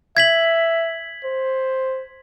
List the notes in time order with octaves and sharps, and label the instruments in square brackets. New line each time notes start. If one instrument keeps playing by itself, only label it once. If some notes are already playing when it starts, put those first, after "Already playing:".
[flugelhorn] E5 [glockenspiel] G#6 B6 F#7
[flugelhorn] C5